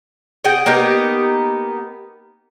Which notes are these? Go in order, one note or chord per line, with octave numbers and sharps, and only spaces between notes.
G#4 F#5 G5
A#3 B3 D#4 G4